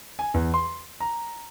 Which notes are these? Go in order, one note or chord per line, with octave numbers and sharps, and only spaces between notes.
G#5
E2
C6
A#5